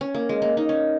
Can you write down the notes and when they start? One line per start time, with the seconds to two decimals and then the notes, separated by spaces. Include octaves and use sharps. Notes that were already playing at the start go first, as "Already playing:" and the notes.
0.01 C#4
0.14 A#3
0.29 G#3
0.42 A#3
0.57 D#4
0.69 C#4